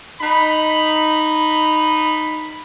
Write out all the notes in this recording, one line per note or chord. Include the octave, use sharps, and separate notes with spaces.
D#4 B5